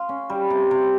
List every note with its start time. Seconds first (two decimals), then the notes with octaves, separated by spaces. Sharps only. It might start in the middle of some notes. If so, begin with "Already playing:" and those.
Already playing: F5 C6
0.09 C#4
0.30 G3
0.50 C3
0.71 C3